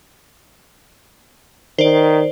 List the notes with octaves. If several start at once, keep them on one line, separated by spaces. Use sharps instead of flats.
D#3 C5 D5